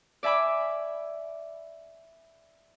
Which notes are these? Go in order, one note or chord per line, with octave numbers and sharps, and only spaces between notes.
D5 E5 G#5 B5 D6